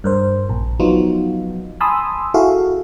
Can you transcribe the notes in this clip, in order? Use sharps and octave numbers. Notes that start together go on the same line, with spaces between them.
G2 A#4 C5
A#1
F3 F#3 B3 D#4 F4 F#4
G#5 A5 B5 C6 D#6 E6
E4 F#4 G#4 A4 E5 F5